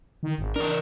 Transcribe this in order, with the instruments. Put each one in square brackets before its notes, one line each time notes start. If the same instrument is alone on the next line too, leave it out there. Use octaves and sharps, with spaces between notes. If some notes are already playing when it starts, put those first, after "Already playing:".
[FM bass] D#3
G#1
[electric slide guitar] E3 A#4 [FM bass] D4